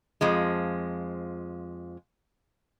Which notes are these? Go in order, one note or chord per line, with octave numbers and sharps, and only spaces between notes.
F2 F3 G#3